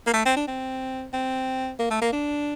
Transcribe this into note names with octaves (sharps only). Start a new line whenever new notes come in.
A#3
A3
C4
D4
C4
C4
A#3
A3
A#3
D4